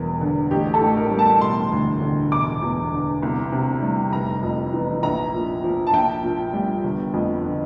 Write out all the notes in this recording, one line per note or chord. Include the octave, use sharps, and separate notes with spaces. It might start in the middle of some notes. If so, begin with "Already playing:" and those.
Already playing: E1 E2 G3 A#4
D3
A1 G4
A4
A2
A#4
G3
A5
E1 C6
D2
D3
E1 D6
E2
D3
C2
C3
G3
F1 A#5
F2
E3
A#1 A#5
A#2
F3
A5
A#1 G5
A#2
G3
G1
F2
D3